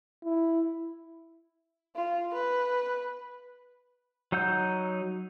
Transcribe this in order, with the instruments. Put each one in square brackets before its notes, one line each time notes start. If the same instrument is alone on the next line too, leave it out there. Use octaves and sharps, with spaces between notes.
[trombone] E4
[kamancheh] F4
B4
[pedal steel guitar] F#3 D#4 F#5 E6 G6